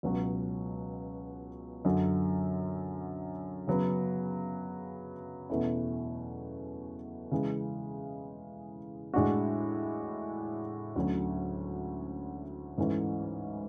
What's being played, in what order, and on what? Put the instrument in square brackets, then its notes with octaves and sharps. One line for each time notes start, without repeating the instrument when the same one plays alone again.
[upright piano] C#2 B2 F#3 C#4 F#4
F#2 D3 F#3
C#3 F#3 B3
E2 B2 A3 C#4 E4
C#3 E3 G#3
A2 G#3 D4 F#4
D2 D3 F#3 C#4
G#2 E3 A3 C#4